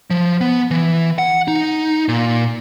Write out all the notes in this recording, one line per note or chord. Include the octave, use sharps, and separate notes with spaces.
F3
B3
E3
F#5
D#4
A#2